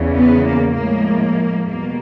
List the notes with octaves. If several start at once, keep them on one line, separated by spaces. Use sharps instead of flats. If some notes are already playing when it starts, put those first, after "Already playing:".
Already playing: E2 C#3 E3
B3
A#3
A2 F3 G#3 A#3
E2 B2 G3 A#3